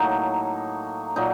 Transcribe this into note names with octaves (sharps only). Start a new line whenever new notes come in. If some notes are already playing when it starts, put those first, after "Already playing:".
Already playing: A2 F#3 A#3 D#4
A#2 F#3 D#4